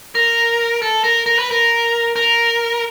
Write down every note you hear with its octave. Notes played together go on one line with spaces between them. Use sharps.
A#4
A4
A#4
A#4
B4
A#4
A#4